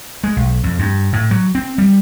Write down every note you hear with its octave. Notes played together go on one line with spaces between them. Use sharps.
G#3
B1
F2
G2
A2
F#3
C4
G3